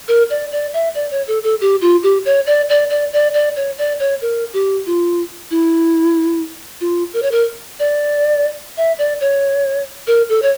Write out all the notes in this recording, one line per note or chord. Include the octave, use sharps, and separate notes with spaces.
A#4
D5
D5
E5
D5
C#5
A4
A4
G4
F4
G4
C#5
D5
D5
D5
D5
D5
C#5
D5
C#5
A#4
G4
F4
E4
F4
A#4
C#5
A#4
D5
E5
D5
C#5
A#4
A4
C#5